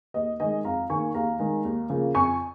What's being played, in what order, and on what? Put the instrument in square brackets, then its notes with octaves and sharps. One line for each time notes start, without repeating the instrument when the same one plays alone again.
[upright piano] D#2 D#5
D#3 G#3 D#5 G#5
F2 F5 A#5
D#3 A#3 G#5 C#6
D#2 F5 A#5
D#3 G#3
D#2
C#3 F3 A#3
F2 G#5 C#6